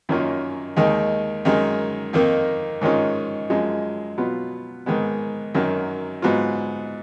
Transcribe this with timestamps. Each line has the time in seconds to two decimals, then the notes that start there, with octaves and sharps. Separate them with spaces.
0.09 F#2 D#3 A#3 C#4 F4
0.76 D#2 D#3 G#3 D#4
1.45 F#2 D#3 G#3 D#4
2.13 F2 D#3 A#3 D#4
2.81 G#2 D#3 G#3 C#4 F4
3.50 F#2 F3 G#3 D#4
4.18 B2 F#3 B3 F4
4.86 G#2 D#3 G#3 B3
5.54 F#2 D#3 F#3
6.22 G#2 F#3 B3 F4